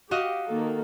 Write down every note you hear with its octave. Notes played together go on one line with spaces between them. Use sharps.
F#4 G4 D#5 F5
D#3 A#3 A4